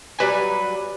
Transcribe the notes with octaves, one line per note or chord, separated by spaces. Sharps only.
F#3 G3 B4 G#5